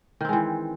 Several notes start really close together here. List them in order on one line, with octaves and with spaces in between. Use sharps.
D#3 C4 G#3 E3